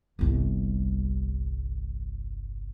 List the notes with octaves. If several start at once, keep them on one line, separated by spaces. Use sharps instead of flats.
G1 C2